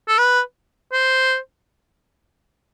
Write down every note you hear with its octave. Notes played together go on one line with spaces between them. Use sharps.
A4
B4
C5